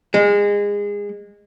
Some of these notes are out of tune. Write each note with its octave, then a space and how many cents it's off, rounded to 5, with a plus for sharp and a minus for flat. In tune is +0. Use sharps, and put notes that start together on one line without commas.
G#3 -25